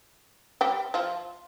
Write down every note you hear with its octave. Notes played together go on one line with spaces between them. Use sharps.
G3 G4
F3 F4